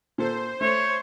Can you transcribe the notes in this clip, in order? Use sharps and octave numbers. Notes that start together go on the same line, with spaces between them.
A#2 A4 C5
A3 C#5